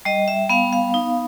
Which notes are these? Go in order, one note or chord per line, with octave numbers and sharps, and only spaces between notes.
G3 D#5
E5
B3 F5
F5
D#4